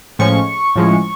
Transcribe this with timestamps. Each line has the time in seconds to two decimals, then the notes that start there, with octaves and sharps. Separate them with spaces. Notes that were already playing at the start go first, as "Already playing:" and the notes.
0.19 A2 F3 G#3 C#4 C#6
0.76 A2 F3 G#3 C#4